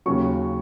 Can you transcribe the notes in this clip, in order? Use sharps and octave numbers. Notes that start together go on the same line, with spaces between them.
D#2 C#3 F#3 C#6